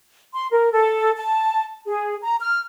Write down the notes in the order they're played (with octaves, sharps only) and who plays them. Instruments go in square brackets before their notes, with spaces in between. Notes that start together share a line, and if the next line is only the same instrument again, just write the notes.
[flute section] C6
A#4
A4
A5
G#4
A#5
F6